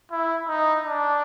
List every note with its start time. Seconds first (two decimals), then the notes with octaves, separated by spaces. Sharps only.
0.11 E4
0.48 D#4
0.85 D4